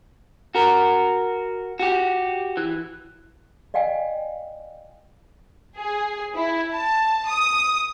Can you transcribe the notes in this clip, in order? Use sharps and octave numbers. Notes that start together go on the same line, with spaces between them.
F#4 A#4
F#4 G4
E3
D5 D#5 F5 G5 G#5
G#4
E4
A5
D#6